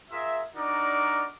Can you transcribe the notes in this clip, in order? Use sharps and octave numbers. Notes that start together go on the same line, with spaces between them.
F4 G#4 A#4 E5
D4 D#4 F#4 A#4 D5